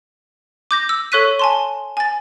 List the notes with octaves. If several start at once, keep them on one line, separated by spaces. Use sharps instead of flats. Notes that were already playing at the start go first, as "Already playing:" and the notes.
D6 G6 A#6
E6
A4 C#5 C#6 F#6 B6 D#7
G#5 A5 C6
G#5 A6